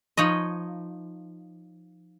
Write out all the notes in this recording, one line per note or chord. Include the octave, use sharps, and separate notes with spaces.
F3 D#4 C#5 D#5